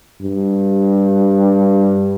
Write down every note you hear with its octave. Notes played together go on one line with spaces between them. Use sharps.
G2